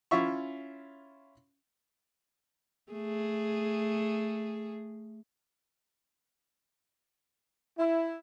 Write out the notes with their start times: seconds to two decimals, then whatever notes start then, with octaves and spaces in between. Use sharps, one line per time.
0.11 C#4 E4 F4 E5 C#6
2.92 A3 G#4
7.78 E4